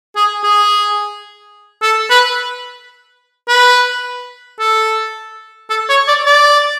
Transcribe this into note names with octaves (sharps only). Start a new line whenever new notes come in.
G#4
G#4
A4
B4
B4
A4
A4
C#5
D5
D5